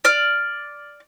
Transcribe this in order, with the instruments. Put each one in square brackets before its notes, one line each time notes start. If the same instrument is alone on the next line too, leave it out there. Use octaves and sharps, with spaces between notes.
[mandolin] D5 F6